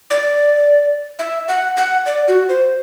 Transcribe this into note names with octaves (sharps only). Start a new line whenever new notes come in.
D5
E5
F#5
F#5
D5
F#4
C5